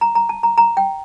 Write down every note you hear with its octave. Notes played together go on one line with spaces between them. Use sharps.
A#5
A#5
A5
A#5
A#5
G5